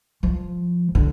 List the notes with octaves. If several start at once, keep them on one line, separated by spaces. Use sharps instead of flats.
F3
D3